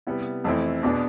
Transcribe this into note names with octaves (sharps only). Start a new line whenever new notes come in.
C3 G3 B3 E4
F2 E3 A3 C4 E4
E2 B2 B3 D4